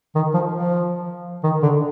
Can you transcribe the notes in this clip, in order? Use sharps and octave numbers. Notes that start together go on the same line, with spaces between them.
D#3
F3
F3
D#3
D3